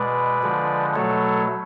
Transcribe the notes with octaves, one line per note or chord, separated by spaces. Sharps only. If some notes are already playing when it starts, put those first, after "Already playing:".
Already playing: B2 G#3 B4 D5
D3 F3 G#3
B2 F#3 A3 A4 C#5